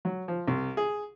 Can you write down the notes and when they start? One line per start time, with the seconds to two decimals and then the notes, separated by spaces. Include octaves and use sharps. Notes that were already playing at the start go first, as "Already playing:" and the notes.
0.05 F#3
0.28 F3
0.48 C2
0.77 G#4